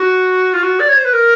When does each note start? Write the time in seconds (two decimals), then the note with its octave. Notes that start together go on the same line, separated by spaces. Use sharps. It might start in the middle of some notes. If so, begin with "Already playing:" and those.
Already playing: F#4
0.53 F4
0.63 F#4
0.80 D5
0.89 C#5
0.97 C5
1.05 B4
1.13 A#4